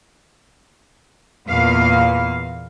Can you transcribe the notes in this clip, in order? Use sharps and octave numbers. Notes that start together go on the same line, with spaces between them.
E2 A#2 A#3 B3 F5